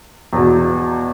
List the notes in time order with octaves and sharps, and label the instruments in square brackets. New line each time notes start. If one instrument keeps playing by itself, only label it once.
[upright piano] E2 B2